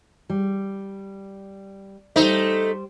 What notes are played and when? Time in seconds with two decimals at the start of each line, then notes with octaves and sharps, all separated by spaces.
0.30 G3
2.16 G3 A3 D#4 C5